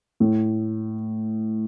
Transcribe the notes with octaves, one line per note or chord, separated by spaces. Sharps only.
A2